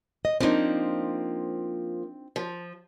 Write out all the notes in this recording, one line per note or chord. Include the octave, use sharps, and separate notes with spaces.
D#5
F3 A#3 C4 D4 D#4
F3